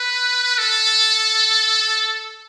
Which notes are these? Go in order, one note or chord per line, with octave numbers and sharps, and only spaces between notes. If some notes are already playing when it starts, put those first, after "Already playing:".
Already playing: B4
A4